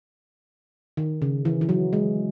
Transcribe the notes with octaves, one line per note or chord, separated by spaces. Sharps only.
D#3
C#3
E3
E3
F#3
G#3